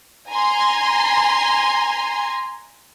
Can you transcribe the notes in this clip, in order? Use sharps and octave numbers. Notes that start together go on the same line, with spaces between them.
G#5 A#5 C6